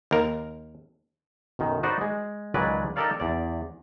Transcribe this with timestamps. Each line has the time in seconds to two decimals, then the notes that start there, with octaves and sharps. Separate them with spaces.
0.11 D#2 A#4
1.59 B1 F#2 D#3
1.83 D#4 F#4 B4 C5 D5 D#5
2.01 G#3
2.54 C#2 D#3 F#3 G#3 B4 D5
2.96 D#4 G4 A4 A#4 D5 F5
3.20 E2 D5